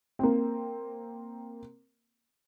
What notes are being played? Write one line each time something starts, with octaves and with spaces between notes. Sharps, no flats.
A#3 C4